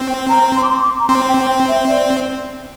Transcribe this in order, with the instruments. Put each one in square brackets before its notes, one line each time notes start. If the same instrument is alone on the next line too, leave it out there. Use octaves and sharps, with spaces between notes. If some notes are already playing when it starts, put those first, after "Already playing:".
Already playing: [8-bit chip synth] C4
[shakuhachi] G5
A#5
C6
D6
C6
D6
A#5
[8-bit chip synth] C4 [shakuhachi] C6
[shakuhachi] G5
G5
E5
D5